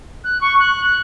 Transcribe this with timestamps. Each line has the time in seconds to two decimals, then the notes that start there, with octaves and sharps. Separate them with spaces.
0.24 F#6
0.41 C#6
0.58 F#6
0.84 F#6